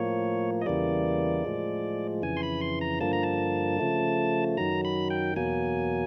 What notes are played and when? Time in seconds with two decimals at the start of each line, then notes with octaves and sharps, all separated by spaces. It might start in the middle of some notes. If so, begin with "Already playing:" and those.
Already playing: A2 F3 A#3 C#5
0.61 D#5
0.66 E2 C#3 E3 G3 A#3 D5
1.45 A2 F3 G#3
2.22 F2 C#3 E3 G#5
2.37 C6
2.43 B5
2.61 C6
2.81 A#5
3.01 G2 D3 F3 A#3 A5
3.13 A#5
3.23 A5
3.79 C#3 F3 A3
4.57 F#2 D#3 F#3 A#5
4.85 B5
5.10 G5
5.36 E2 B2 F#3 A#3 G#5